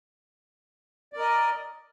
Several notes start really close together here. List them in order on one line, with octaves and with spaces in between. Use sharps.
D5 A#4 D#5